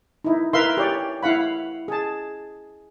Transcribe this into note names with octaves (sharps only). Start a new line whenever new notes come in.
D#4 E4
E4 A#4 B4 E5 F5 C6
G4 C#5 D5
E4 F5 F#5 B5
G#4 A5